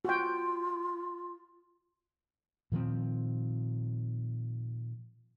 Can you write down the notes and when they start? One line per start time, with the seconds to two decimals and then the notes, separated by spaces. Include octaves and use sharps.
0.05 F4 F#4 G5
2.72 A#2 D#3 F3 C4